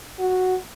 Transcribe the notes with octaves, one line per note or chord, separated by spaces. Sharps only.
F#4